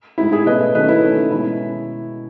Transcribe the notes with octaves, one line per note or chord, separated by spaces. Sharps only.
A2 G#3 D#4 E4
E4 G#4
B2 A3 C#4 B4 D#5
D#3 F#3 A3 C#4 B4 D#5
E4
D#3 A3 C#4
B2 G#3 C#4 E4